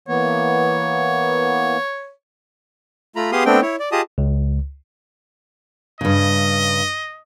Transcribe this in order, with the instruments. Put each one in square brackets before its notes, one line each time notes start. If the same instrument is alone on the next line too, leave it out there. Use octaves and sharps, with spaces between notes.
[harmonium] E3 A#3 B3 [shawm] C#5
[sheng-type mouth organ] A3 F4 A#5 B5
B3 G4 G#4 F5 C6 D#6
A3 B3 C4 D4 G5
E4 C#5
D5
F4 G4 G#4 D#5 A5 D#6
[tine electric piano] C#2
[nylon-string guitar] G2 C#3 [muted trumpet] D#5